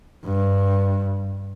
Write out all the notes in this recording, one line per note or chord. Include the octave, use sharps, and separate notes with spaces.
G2